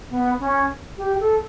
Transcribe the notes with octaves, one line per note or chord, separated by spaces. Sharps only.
B3
C#4
G4
A4